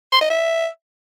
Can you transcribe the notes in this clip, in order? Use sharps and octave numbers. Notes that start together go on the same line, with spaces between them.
C6
D#5
E5